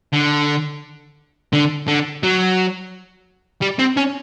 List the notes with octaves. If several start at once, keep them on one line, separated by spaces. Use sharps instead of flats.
D3
D3
D3
F#3
G3
C4
C#4